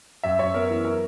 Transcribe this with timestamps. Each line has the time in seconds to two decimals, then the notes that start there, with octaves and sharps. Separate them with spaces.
0.23 F#2 E5
0.39 F#2 C#5
0.54 B3 A#4
0.70 E3
0.85 A#4